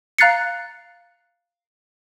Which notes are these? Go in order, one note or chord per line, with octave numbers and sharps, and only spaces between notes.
F5 A#5 F#6 A6 C7 C#7